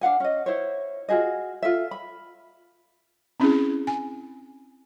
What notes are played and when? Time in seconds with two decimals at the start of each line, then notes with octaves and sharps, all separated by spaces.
0.01 D4 F5 F#5 G#5
0.20 C#4 D#5
0.46 E4 C5 C#5
1.09 F4 F#4 G#4 D#5
1.63 F4 A4 E5
1.91 B5
3.40 C4 C#4 E4 G#4
3.87 G#5